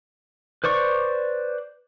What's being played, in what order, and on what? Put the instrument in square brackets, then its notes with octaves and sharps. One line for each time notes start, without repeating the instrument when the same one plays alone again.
[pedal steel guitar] B4 C5 D5 C#6